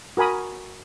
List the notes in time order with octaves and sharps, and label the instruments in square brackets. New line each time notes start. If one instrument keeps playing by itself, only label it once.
[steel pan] F#4 A#4 G#5 B5 D#6